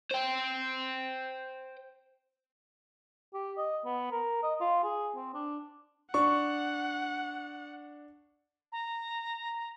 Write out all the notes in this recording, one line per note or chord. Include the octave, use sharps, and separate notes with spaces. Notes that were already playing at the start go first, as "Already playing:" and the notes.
C5 G5
G4
D#5
B3
A#4
D#5
F4
G#4
C4
D4
D4 F#5 C#6
A#5